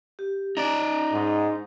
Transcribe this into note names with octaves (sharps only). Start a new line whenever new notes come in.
G4
D#4 D5 A#5
G#2